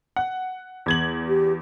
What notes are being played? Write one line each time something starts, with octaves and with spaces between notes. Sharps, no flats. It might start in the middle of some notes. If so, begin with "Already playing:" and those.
F#5
E2 G#6 F#7
G4